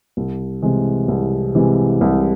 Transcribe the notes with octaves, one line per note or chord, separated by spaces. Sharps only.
C2
C3 E3 G#3
C2
C3 E3 G#3
C2